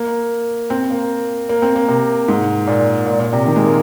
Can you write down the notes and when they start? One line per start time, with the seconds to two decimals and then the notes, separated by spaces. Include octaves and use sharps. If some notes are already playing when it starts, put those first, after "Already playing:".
Already playing: A#3
0.70 C4
0.90 A#3
1.49 A#3
1.62 C4
1.75 A#3
1.88 C3
2.28 G#2
2.67 A#2
3.06 A#2
3.20 A#2
3.33 C3
3.46 D#3
3.56 G#3
3.66 A#3